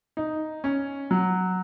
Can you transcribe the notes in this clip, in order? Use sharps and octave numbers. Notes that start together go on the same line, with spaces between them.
D#4
C#4
F#3